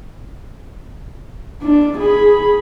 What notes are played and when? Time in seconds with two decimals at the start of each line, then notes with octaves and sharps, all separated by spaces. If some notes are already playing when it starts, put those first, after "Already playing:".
1.62 D4
1.99 G#4 B5